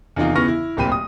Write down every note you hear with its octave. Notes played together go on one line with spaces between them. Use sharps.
E2 C3 D#3 D#4 F4
C#3 E3 B3 C#6 F6 A#6
E4
D1 A#2 C4 G4 B5 D#7
D#6